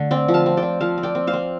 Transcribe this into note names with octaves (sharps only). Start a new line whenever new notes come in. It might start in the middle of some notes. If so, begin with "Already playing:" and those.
Already playing: D3 A3
C4 D5 G5
F3
F5 A5
C4
D5 G5
C4
F3 F5 A5
C4
D5 G5
C4
C5 F5
C4